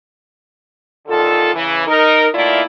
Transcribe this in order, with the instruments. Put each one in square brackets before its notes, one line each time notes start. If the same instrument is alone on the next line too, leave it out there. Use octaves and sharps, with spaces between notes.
[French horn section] A#2 D3 D#3 F4 A4
C#3 E3
D#4 A#4
D#3 A3 A#3 E4 F4 D5